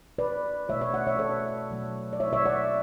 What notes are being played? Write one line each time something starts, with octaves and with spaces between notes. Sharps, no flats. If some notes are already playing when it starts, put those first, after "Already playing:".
B4 D5
B2 A3 C#5 E5
C#5 E5
D5 F#5
C#5 E5
A4 C#5
B2 F#3 A3
D5
C#5 E5
C#5 E5
D5 F#5